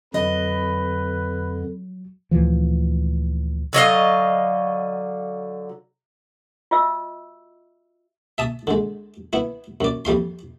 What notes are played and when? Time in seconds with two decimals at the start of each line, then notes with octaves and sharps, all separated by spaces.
0.14 F2 D3 F#3 B4 D#5
2.31 D2 A#2 E3 F3
3.73 D3 F#3 D#5 F5
6.71 F4 F#4 D#5 E5 E6
8.38 E5 A5 D#6
8.67 D3 G#3
9.33 B3 E4
9.81 F#2 D5
10.05 F2 G3 F5 C6